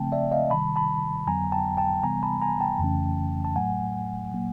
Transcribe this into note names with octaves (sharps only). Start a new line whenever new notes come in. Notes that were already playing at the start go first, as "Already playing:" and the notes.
Already playing: C#3 F3 A3 C4 G5 A5
D5 E5
D#5 F5
C3 D#3 G3 A5 B5
A5 B5
F2 D3 F#3 B3 G#5 A#5
G5 A5
G5 A5
C3 E3 G3 B3 G#5 A#5
A5 B5
G#5 A#5
G5 A5
F2 C#3 E3 A3 C#4
A5
A2 F#3 A3 F#5 G#5
A#2 F#3 A#3